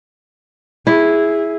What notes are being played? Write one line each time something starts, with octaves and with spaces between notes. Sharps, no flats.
E4 G#4